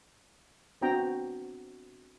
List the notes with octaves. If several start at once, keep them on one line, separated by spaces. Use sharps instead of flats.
B3 C4 D4 F#4 G5 A#5